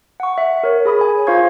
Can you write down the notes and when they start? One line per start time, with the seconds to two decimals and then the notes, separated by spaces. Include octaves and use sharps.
0.20 F#5 C#6
0.38 E5
0.64 A#4 C#5
0.85 G#4 B5 D#6
1.01 G#5
1.27 F4 C5 F5 C#6 G#6